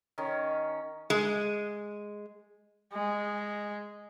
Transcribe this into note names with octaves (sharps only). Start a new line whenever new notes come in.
D#3 C#4
G#3
G#3